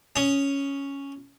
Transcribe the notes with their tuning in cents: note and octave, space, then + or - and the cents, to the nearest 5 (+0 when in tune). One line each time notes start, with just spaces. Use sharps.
C#4 +0 D#6 +0